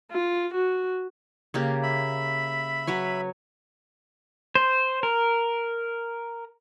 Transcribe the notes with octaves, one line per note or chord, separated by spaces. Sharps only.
F4
F#4
C#3 A#3 G4
E5 B5
F#3 B4 C#5
C5
A#4